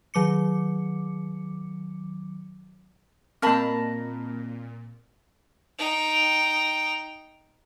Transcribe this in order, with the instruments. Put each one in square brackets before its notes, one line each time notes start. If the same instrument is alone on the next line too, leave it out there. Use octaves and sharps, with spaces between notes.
[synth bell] D#3 F#3 D6 C#7
[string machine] A#2 [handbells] A#3 C4 [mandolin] A#4 A5 B5
[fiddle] D#4 G5